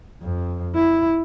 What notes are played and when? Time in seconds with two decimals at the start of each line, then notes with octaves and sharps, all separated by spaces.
0.23 F2
0.75 E4